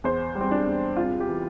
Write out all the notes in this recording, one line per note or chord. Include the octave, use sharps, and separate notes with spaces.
E2 C5
G3
C4
D4
E2
C2 F4
G4
E3